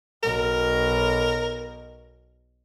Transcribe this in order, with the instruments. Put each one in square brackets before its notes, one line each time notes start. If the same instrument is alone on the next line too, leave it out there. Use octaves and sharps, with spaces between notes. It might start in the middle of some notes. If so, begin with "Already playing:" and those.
[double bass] B1 B2 [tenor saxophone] A#4